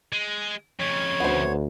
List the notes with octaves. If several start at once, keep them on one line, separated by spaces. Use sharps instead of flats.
G#3
F2 C#3 C#5
D2 B3 C5